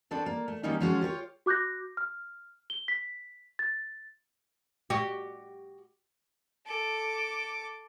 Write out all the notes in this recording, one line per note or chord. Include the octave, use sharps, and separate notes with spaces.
C4 D4 F#4 A4 B4
A#3
A3
D#3 F#3 G3 A#3 C#4 D#4
F3 G#3 C#4 F4 F#4
F4 G4 B4 C#5
F#4 D6 F#6 G6 A#6
F6
G7
B6
A6
F#4 G4
A4 D6